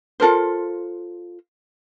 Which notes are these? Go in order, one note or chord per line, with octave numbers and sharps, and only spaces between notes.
F4 A4 A#4 C5